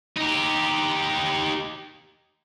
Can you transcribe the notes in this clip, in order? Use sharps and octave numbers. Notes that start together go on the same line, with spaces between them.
D#4 G4